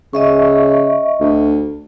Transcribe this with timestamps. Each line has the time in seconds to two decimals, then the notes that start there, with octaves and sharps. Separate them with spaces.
0.13 C#3 D#5 E5 C#6
1.21 D2